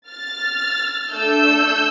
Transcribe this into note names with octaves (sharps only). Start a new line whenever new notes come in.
F6 A6
A3 D4 A4 E6 G6